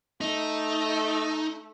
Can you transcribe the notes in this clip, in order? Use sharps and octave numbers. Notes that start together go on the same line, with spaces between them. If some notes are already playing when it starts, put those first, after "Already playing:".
A3 D#4